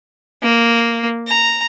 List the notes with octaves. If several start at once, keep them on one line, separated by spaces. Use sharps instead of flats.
A#3
A#5